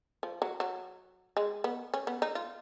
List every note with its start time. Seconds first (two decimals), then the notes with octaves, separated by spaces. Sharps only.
0.23 F3
0.42 F#3
0.60 F#3
1.37 G#3
1.64 B3
1.94 C#4
2.07 B3
2.22 D#4
2.35 F4